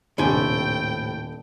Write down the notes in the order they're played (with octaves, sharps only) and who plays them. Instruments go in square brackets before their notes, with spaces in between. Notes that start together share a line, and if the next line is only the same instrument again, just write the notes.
[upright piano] D#1 D4 [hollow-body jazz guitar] A2 C3 G#5 [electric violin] G5